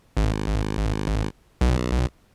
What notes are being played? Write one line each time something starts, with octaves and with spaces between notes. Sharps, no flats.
G#1
B1